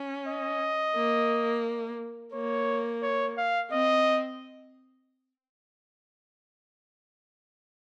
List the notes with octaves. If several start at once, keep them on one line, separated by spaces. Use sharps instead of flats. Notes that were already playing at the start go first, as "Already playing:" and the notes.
Already playing: C#4
D#5
A#3
A#3 C#5
C#5
F5
C4 D#5